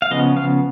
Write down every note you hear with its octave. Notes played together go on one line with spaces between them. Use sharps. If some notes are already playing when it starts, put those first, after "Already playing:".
F5
C#3 F3 B3 D#5
F5